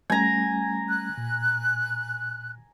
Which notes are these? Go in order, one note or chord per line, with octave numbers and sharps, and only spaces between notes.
G3 A3 C#4 G#5 A#5
F#6
A#2